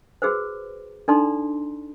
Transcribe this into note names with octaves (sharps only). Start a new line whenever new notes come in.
F#4 G#4 B4 C5
D4 D#4 A4 D5 A#5 C6